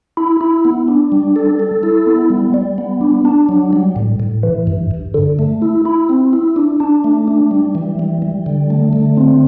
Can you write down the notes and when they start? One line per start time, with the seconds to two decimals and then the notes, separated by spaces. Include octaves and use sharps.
0.17 E4
0.41 E4
0.65 B3
0.88 D4
1.12 G3
1.36 A4
1.59 A4
1.83 E4
2.06 B3
2.30 G3
2.54 G3
2.78 B3
3.01 D4
3.25 D4
3.49 F#3
3.73 G3
3.96 A2
4.20 A2
4.43 E3
4.67 G2
4.91 G2
5.14 D3
5.39 A3
5.62 E4
5.85 E4
6.09 C4
6.33 E4
6.56 D4
6.80 D4
7.04 A3
7.28 D4
7.51 G3
7.75 E3
7.99 G3
8.22 G3
8.46 D3
8.70 A3
8.93 D3
9.17 C4